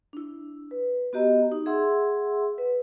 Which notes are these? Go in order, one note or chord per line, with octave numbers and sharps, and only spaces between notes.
D4 E4
B4
B3 F#4 G4 D#5 A#5
D#4
G#4 E5 F#5 C6 E6
B4